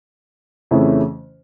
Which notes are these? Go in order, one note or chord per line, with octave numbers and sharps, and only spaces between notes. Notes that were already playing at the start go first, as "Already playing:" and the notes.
F2 C#3 E3 A3 C#4